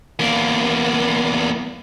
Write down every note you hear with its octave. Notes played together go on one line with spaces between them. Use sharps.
E2 A#3